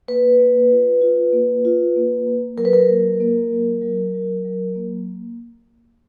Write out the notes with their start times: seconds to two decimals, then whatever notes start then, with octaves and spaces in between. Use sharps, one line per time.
0.08 A#3 B4
0.39 A#3
0.72 F4
1.02 F4
1.33 A#3
1.65 F4
1.96 A#3
2.27 A#3
2.57 F#3 A#4
2.65 B4
2.73 A#4
2.88 A#3
3.20 A#3
3.51 F#3
3.82 F#3
4.14 F#3
4.45 F#3
4.75 A#3